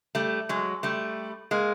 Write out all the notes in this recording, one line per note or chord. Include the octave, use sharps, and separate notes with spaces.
G3 A3
F#3 G#3
G3 A3
G#3 A#3